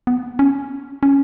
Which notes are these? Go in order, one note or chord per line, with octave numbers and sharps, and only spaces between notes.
B3
C#4
C#4